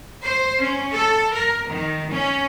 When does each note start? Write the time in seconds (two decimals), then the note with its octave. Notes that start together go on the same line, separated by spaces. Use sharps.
0.22 C5
0.60 C#4
0.95 A4
1.35 A#4
1.69 D#3
2.12 C#4